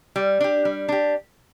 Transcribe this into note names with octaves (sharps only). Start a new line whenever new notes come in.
G3
D4 G4
G3
D4 G4